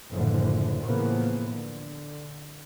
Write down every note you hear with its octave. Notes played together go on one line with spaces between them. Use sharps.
F#1 A2 D3 E3 F3
A2 C#3 E3 F3 A#3 B3
D3